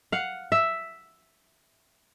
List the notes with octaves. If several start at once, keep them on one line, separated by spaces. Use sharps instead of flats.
F5 F#5
E5